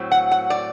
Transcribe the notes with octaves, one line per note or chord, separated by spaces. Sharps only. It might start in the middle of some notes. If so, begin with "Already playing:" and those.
Already playing: A2 F#3 C4
F#5
F#5
D5